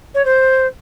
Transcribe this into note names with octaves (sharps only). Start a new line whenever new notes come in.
C#5
C5